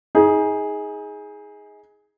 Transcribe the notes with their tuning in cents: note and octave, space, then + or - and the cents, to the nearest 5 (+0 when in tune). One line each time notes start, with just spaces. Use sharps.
D#4 +30 G#4 +0